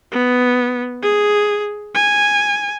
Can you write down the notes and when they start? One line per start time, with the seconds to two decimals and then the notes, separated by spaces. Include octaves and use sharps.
0.12 B3
1.02 G#4
1.95 G#5